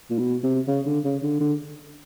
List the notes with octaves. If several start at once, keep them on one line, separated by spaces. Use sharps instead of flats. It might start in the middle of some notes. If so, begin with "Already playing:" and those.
A#2
B2
C3
C#3
D3
C#3
D3
D3